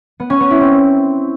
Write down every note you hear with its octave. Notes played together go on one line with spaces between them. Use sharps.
B3
C#4
B3
E4
C4